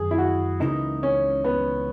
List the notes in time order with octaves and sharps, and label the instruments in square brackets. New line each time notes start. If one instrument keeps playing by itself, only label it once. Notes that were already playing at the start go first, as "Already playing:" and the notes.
Already playing: [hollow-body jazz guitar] F#2 D#3 F#3 [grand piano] G#4
[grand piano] E4
F#4
[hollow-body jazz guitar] C#2 C#3 E3 A#3 E4 [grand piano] D#4
[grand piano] C#4
B3